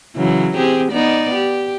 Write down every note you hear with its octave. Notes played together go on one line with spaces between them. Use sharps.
C#3 E3 F#3
C4 G4 G#4
B3 D#4 D5
G4